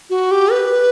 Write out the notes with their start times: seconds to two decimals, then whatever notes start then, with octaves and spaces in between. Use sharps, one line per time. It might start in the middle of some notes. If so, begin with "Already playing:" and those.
0.10 F#4
0.31 G4
0.52 B4